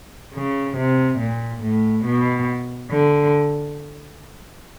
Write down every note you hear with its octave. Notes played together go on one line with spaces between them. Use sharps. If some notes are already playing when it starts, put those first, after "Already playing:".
C#3
C3
A#2
A2
B2
D3